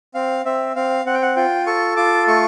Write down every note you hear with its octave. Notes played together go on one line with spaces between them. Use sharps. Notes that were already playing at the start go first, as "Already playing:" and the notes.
C4 F5
C4 E5
C4 F5
C4 F#5
G5
F#5
F4 G5
A4 C#6
F4 D6
A3 C#6